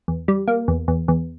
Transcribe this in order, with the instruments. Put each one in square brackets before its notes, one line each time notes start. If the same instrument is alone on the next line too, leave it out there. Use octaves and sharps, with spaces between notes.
[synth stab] E2
G3
A#3
E2
E2
E2